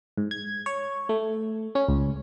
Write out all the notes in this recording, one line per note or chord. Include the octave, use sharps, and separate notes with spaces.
G#2
G#6
C#5
A3
C#4
C#2